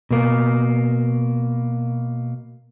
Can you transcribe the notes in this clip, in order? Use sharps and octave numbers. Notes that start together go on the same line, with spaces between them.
B2 A#3